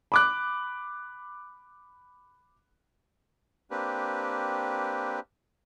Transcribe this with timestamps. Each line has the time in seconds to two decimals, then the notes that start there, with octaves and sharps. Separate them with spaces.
0.12 B5 D6 F#6
3.71 A#3 C4 D4 G4 B4